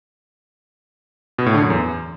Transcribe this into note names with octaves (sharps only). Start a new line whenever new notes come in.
B2
A2
D3
F#2
E2